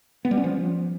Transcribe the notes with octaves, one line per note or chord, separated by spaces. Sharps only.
B3
G3
C#4
F3